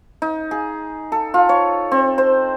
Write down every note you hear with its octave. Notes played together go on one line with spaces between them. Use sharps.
D#4
G#4
A4
F4
C#5
C4
C5